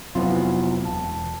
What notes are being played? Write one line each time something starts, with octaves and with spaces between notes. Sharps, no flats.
F1 F#3 B3 C4 E4 F4
E1 A5